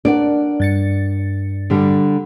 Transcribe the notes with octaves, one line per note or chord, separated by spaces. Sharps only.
D4 A#4 D5 F#5
G2 A6 C#7
D3 G3